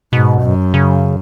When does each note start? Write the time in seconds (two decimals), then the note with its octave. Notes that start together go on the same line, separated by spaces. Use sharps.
0.13 G#2 B2
0.42 F#2
0.74 C#3